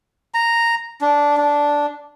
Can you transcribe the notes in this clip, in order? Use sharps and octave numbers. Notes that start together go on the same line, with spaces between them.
A#5
D4
D4